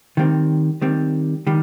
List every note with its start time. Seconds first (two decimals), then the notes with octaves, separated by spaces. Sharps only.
0.17 D#3 G3 C4
0.82 D#3 G3 C4
1.47 D#3 G3